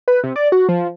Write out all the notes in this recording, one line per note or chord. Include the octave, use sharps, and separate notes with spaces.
B4
C3
D5
F#4
F3